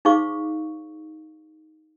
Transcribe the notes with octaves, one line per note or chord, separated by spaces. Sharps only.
D#4 G#4 C5 F5 C#6 D6